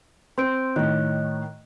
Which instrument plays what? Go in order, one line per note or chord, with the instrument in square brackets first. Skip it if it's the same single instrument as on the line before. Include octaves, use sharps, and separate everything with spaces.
[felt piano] C4 [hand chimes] C6 G6 D7
[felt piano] A2 D#3 [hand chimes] C#5 D#5 F#6